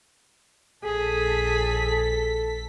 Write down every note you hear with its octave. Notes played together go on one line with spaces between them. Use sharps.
A#1 G#4 A4 B6